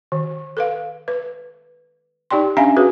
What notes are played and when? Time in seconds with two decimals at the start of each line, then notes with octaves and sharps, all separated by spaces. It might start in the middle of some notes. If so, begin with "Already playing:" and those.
0.12 D#3
0.57 A4 B4 F5
1.08 B4
2.31 D#4 G4 D5 G5 C6
2.57 C#4 D4 E5 F5 G#5 A#5
2.77 F#4 G#4 B4